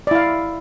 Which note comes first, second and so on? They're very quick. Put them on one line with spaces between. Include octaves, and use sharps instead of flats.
D5 E4 F5